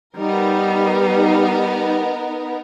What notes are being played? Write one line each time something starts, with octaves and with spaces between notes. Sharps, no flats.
G3 B3 D#4 A#4